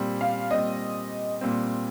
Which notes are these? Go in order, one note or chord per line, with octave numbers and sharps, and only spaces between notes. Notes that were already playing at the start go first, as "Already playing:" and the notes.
Already playing: A#2 G3 C4
F5
A#2 G3 C4 D#5
A#2 G3 C4